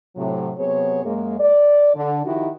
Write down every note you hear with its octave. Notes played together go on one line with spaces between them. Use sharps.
A2 C3 F#3
C3 F#3 B3 G#4 C#5
F#2 G#3 A#3
D5
D3
D#3 F3 D#4 E4 F#4 G4